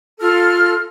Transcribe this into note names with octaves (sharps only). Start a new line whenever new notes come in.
F4 A4 F6